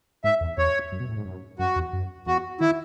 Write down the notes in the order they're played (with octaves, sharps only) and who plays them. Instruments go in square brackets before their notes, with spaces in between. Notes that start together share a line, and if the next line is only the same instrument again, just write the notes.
[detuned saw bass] G#2 [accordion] E5
[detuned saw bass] E2
[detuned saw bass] E2 [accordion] C#5
[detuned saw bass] F#2
B2
A2
G#2
F#2
[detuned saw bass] F#2 [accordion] F#4
[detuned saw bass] E2
F#2
[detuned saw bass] E2 [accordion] F#4
[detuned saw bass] D#3 [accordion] E4